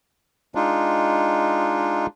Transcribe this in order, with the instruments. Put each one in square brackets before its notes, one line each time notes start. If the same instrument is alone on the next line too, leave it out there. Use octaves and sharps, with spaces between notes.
[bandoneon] G#3 D4 D#4 F4